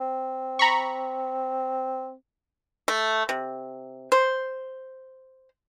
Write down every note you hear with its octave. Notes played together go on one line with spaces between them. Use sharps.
C4
A#5 B5 C#6
A3
C3
C5